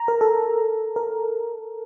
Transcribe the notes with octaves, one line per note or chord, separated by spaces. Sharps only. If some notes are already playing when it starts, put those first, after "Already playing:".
Already playing: A#5
A#4
A4
A#4